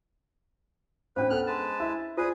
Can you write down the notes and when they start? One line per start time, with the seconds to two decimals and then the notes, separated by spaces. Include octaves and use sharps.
1.16 A1 C#4 D4 B4 C5
1.30 B3 A4 F#5 F6 F#6
1.47 G#3 B4 A5
1.80 E4
2.17 F4 G#4 B4 C5 D5 D#6